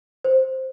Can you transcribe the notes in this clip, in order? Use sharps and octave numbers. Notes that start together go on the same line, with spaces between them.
C5